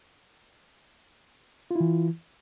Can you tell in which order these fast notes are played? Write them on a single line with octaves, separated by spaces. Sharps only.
F4 E4 E3